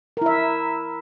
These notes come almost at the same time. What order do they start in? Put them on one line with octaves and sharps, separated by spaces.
A#4 E4 E5